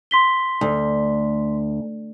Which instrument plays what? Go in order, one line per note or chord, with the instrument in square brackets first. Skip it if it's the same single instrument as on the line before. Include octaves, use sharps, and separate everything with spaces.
[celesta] C6 B6 G7
[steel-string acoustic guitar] D2